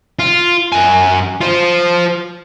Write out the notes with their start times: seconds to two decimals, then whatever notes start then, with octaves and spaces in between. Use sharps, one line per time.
0.19 F4
0.73 F#2 G#5
1.41 F4 C5